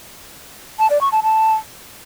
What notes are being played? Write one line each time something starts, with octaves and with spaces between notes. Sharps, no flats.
A5
D5
C#6
A5
A5